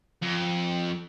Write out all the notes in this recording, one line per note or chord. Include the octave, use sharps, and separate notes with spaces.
F2